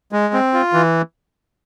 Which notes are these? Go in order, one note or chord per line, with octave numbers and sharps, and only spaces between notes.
G#3
C4
F4
E3